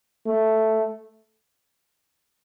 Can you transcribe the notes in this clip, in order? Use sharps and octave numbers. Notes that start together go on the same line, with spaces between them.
A3